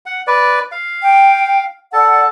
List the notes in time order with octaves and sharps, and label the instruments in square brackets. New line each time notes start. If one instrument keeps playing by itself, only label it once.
[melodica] F#5
B4 D5
F5
[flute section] G5
[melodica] A4 A5 [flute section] D5 F#5